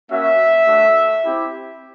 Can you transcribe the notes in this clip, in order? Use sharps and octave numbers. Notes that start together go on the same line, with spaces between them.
A#3 C#4 F#4 E5
A3 D4 F#4
C4 E4 G4